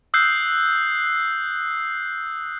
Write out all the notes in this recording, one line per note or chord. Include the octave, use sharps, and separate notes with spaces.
D#6 E6 F#6 G6 C7